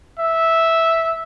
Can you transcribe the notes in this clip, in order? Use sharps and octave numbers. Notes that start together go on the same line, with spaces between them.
E5